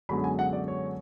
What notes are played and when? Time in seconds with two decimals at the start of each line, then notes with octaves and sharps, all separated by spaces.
0.09 F#2 D3 G#3 B3 B5
0.24 G#5
0.39 F#5
0.53 D5
0.68 C#5